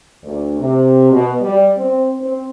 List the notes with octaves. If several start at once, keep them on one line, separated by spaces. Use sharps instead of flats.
D2
C3
B2
G3
C4
C4